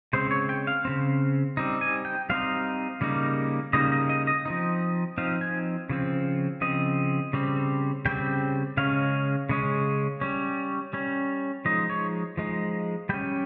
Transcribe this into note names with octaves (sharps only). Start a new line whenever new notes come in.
C#3 G#3 C4 C5
C#5
G5
F5
C#3 G#3 C4
G3 C4 D#4
G#5
G5
G3 C4 D#4 F5
C#3 G3 A#3 D#4
C#3 G3 A#3 D#4 D#5
D#5
D#5
D#5
F3 C4 D#4
F3 C4 D#4 F5
G#5
C#3 F3 C4
C#3 F3 C4 D#5
C#3 G3 C4
C#3 G3 C4 G5
C#3 G#3 C#4 F5
C#3 G#3 C#4
G3 C#4
G3 C#4
F3 G#3 D#4 D#5
C#5
F3 G#3 D#4
G3 C#4 G5